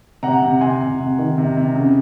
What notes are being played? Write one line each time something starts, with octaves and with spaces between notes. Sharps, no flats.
C3 F#5 A#5
C3
C3 G#5 C6
C3
C3
D#3
C3
C3
C#3